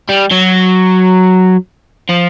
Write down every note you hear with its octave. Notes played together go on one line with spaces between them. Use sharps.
G3
F#3
F3